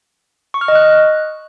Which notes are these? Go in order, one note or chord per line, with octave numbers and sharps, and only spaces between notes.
C#6
F6
D#5
F#6